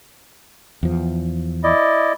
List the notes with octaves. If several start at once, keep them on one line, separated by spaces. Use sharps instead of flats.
E2 F3
E4 D5 D#5